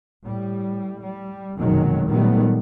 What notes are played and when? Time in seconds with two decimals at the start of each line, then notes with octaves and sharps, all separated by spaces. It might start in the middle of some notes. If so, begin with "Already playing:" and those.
0.24 A2 G3
1.04 G3
1.57 F1 F#2 B2 D#3 F#3 G#3
2.07 A#2 D#3 F#3 G3 A3 B3